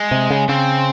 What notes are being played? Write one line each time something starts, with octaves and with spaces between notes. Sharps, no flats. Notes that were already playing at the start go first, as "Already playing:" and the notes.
Already playing: G#3
C3
C#3
C#3 C4